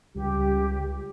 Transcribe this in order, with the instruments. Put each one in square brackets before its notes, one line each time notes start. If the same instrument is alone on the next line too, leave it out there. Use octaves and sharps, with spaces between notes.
[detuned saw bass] C#2 [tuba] G3 [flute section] G4